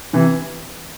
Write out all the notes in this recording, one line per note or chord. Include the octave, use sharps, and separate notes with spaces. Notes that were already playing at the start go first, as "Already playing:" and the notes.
C3 E3